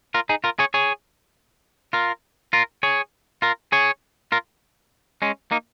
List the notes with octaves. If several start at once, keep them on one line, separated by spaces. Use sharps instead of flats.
F4 A#4
D#4 G#4
F4 A#4
G#4 C#5
G#4 C#5
F4 A#4
F4 A#4
G#4 C#5
F4 A#4
G#4 C#5
F4 A#4
G#3 C#4
A#3 D#4